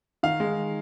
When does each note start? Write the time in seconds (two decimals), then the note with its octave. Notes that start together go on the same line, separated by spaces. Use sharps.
0.23 D#3 F5
0.40 G#3